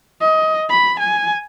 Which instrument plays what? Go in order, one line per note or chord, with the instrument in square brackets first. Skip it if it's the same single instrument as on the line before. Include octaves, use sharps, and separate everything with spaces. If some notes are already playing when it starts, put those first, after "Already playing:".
[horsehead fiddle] D#5
B5
G#5